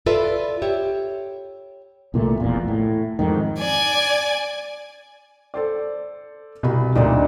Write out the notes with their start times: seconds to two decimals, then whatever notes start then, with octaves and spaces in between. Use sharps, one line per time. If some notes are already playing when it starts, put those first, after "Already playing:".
0.06 F4 A4 B4 D5 E5
0.62 G4 C#5 E5
2.14 C2 A#2 F3 A3
2.40 E1 A#1 E2 A#2
2.68 A2
3.19 F2 G#2 D#3
3.59 D5 G#5
5.54 A4 C5 D5
6.63 C2 B2 B5
6.95 D2 A#2 D4 D#4 D5